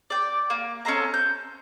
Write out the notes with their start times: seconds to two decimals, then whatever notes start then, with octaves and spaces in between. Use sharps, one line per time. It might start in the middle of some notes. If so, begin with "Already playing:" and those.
0.10 D5 G5
0.50 A#3
0.85 C#4 A4 C5 A#5
1.14 G6